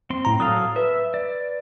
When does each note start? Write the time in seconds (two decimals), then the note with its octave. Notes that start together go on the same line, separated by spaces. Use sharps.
0.10 C4 C6
0.25 A2 A#5
0.40 F#3 A4 F5 D#6
0.76 B4 E5
1.14 D5